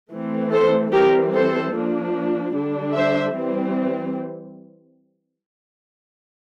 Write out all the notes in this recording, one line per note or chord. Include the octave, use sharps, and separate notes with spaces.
E3 A3 C4
A4 C5
E3 G3 C4 G4 A#4
A4 C5
F3 A#3 D4
D3 G3 D4
C5 E5
E3 G3 C4